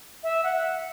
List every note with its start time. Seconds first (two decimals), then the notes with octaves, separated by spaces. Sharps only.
0.23 E5
0.43 F#5